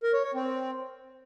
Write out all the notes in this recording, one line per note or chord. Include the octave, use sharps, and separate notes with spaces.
A#4
C#5
C#5
C4